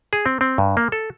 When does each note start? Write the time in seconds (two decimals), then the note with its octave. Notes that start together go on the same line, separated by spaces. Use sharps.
0.13 G#4
0.26 C4
0.41 C4
0.58 G2
0.77 A#3
0.92 A4